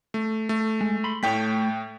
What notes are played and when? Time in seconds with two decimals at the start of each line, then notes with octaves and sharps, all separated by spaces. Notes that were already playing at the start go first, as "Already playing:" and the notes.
0.14 A3
0.49 A3
0.81 G#3
1.04 B5 C6
1.23 A2 A3 C#5 G5 B6